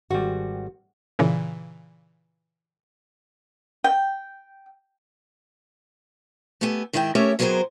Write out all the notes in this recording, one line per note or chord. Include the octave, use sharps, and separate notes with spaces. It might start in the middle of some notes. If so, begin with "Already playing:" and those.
G#1 G3 F#4
A#2 C#3 E3
G5
A3 B3 G4 A4 G#5
G#2 D#3 E4 G#4 B4 G5
A3 C#4 G4 A#4 C#5 E5
C3 F#3 B3 G#4 A#4 C5